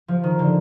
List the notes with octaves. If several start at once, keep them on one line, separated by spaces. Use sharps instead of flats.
F3
D#3
D3